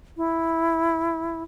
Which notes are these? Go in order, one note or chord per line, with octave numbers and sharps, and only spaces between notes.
E4